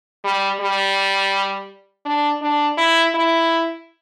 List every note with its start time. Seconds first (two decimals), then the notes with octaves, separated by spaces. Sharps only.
0.24 G3
0.60 G3
2.06 D4
2.42 D4
2.78 E4
3.15 E4